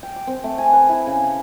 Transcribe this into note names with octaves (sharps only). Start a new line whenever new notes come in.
G5
D6
C4
A3
G#5
B4
E4
C#3